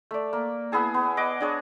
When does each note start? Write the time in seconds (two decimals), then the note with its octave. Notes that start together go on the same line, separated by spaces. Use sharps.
0.11 A3 D5
0.33 A#3
0.72 B3 E4 G#4 A5
0.94 B3
1.17 D#5 F#5 D6
1.41 D4 G#4 C#5